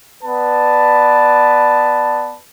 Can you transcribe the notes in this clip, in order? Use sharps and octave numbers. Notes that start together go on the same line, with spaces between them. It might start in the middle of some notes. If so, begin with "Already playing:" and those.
B3 B4 D5 A5